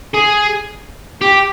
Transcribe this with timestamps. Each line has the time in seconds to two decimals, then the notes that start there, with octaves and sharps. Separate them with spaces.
0.14 G#4
1.21 G4